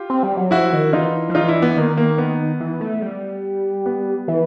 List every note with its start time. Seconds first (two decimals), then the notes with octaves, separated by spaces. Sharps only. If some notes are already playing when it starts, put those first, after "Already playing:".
Already playing: F4 G4
0.10 C4
0.23 G3
0.37 F#3
0.51 F3 E4 F#4
0.73 D#3
0.93 E3 D#4 F4
1.30 F3
1.35 E3 D#4 F4
1.48 D4 E4
1.62 B3
1.76 D#3 A#3
1.97 A#3
2.18 B3
2.60 E3
2.81 A3
3.02 G3
3.86 B3
4.28 E3